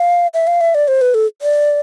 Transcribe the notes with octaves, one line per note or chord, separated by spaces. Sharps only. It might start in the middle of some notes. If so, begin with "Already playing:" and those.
Already playing: F5
E5
F5
E5
D5
C5
B4
A4
D5